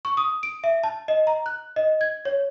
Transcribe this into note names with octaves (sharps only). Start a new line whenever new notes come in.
C#6
D#6
D7
E5
A5
D#5
A#5
F#6
D#5
G#6
C#5